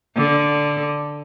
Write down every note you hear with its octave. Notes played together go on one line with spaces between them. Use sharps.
D3